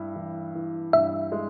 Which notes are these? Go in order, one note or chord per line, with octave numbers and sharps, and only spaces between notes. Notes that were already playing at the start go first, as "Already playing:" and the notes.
Already playing: G2 E4
E3
E3
G2 E5
G#3